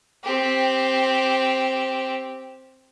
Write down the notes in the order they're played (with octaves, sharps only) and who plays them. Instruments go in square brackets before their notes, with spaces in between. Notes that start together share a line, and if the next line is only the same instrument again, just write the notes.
[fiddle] C4 G4